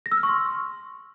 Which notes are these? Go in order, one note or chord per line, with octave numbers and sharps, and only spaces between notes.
A#6
E6
F6
C#6
C6